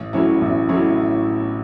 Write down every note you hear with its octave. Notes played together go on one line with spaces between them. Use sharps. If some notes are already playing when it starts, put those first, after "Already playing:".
Already playing: A1
A2 F#3 C#4 E4
A1
A2 F#3 C#4 E4